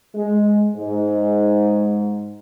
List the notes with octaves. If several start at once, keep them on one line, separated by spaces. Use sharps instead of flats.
G#3
G#2